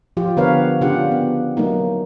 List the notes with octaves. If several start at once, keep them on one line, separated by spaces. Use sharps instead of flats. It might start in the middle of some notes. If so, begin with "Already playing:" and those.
F3 F4 G4
D3 B3 A#4 B4 C#5 F5
C#3 D4 F4 G4 F#5
B3
F#3 A3 A#3 D#4